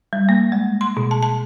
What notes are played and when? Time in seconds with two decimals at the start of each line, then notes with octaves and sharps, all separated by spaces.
0.13 G3
0.29 A#3
0.52 G#3
0.81 C6
0.97 B2
1.11 A5
1.23 A5